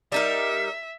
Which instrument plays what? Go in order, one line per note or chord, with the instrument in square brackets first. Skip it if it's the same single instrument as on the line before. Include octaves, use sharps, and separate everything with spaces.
[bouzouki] G3 D#4 A#4 [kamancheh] E5